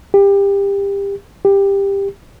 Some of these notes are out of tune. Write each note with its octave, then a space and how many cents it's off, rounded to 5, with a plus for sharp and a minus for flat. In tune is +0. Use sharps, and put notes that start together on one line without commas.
G4 +25
G4 +15